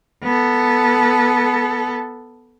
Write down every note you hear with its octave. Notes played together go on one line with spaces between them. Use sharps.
B3 A4